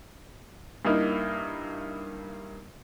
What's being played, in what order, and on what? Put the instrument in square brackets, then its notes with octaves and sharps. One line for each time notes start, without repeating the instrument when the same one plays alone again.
[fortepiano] G2 A#3 D#4 E4